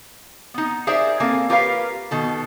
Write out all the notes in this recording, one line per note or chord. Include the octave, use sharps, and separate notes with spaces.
B3 D#4
G#4 A#4 C5 D5 E5
A#3 C4 A4 A#4 G#5
F4 G4 A#4 B4 C#5 F5
B2 D#3 A4